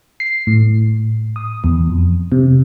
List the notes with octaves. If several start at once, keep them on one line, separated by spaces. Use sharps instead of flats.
C7
A2
D#6
E2
F2
C3